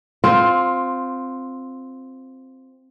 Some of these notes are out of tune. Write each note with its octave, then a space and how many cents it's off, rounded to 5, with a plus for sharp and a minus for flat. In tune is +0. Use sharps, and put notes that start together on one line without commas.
C4 +0 F4 +15